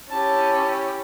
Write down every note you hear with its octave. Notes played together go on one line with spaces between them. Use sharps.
C#4 E4 G4 A5